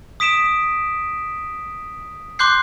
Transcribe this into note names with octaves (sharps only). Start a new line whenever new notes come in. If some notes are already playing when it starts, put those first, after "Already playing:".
D#6 B6 D7 E7
C6 D6 F#6 G6 C7